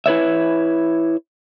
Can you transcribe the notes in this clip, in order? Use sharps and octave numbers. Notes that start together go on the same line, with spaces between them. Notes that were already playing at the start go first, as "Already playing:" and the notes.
E4 B4 C#5 E5